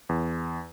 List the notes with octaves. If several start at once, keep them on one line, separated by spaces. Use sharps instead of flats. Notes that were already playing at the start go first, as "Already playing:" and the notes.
E2